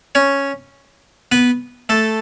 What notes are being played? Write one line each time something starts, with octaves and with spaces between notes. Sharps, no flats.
C#4 C#5
B3 B4
A3 A4